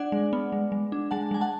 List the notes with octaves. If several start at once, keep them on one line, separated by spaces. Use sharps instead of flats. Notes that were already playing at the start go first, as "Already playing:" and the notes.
Already playing: D4 D5 F#5
G#3
B3
G#3
G#3
D4
G#3 F#5 A5
G#3 G#5
F#5 A5